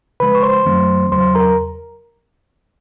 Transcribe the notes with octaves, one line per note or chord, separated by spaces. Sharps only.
C#3 F3 G#3 B4 B5
C#6
C5 C6
F#2 D#3 F#3 A3 C4
E2 C#3 F#3 C5 C6
A#4 A#5